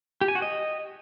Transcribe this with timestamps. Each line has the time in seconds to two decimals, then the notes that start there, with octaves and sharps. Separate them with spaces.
0.21 G4
0.28 G#5
0.35 F#4
0.42 D#5